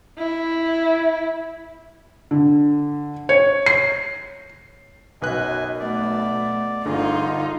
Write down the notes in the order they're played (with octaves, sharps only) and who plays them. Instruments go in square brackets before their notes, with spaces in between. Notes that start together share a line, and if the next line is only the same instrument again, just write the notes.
[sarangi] E4
[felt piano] D3
C#5
C7
[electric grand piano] B1 B4 F#6 [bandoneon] F#2 D#5 G#5
[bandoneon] B2 D5 [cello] A3
[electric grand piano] G1 D3 [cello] D#4 F4 [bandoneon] G#4